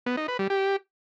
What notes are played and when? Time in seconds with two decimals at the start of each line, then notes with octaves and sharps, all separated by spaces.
0.06 B3
0.17 D#4
0.28 B4
0.39 G3
0.50 G4